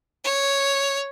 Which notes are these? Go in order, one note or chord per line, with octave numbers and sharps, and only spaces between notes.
C#5